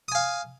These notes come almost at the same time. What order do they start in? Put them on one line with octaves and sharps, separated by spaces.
D#6 G#5 F5